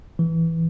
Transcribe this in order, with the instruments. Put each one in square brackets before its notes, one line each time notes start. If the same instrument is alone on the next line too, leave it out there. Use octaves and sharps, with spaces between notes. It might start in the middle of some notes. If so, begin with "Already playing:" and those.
[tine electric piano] E3